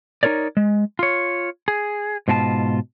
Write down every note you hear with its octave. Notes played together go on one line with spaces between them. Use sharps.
D#4 F4 A#4 C#5 D5
G#3
F4 C#5
G#4
G#2 B2 F4 G4 A5